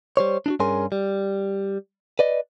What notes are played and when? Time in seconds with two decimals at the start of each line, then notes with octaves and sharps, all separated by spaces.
0.17 G3 C5 C#5
0.46 D4 D#4 F#4
0.60 G2 C#4 G#4 A#4 G#5 C6
0.92 G3
2.19 B4 D5 D#5